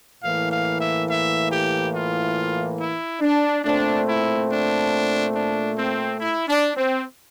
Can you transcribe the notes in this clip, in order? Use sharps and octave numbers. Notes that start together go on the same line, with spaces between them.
A2 E3 A#3 F5
F5
E5
E5
G4
F4
E4
D4
A#2 A3 C4 D4
E4
D4
D4
C4
E4
D4
C4